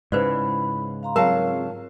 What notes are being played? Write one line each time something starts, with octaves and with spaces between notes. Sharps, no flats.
G#2 C#3 E4 B4 C5 D5 B5
F5 A#5 C6
F#3 C4 F4 G#4 A#4 F5 A5